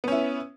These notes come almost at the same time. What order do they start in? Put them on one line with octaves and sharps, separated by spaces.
B3 C#4 E4